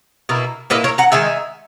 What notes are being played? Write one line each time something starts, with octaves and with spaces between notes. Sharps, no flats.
B2 A#3 E4
A#2 A#3 E4 B4 D#5
A#4 C#5
F#5 A#5
D#3 G#3 D#4 E5 G#5